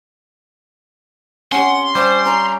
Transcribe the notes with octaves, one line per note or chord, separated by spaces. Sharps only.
C#4 G4 F#5 C6
G3 C5 F5
C#4 G#5 A#5 C#6